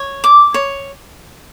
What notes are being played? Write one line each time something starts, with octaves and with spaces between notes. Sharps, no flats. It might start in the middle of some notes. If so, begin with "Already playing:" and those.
Already playing: C#5
D6
C#5